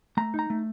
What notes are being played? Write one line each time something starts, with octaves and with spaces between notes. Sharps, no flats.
A3 A#5
D#4 A#5
A3